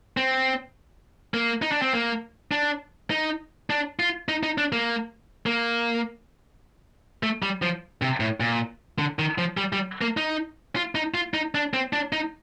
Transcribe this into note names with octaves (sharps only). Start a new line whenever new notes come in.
C4
A#3
D#4
D4
C4
A#3
D4
D#4
D4
F4
D#4
D#4
D4
A#3
A#3
A3
G3
F3
C3
A2
A#2
D3
D#3
F3
G3
G3
A#3
D#4
F4
D#4
F4
D#4
D4
C4
D4
D#4